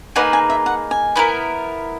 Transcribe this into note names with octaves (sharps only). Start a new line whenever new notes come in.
A#3 D#4 G#4 B4 F#5
G#5
E5
F#5
G#5
B3 E4 A#4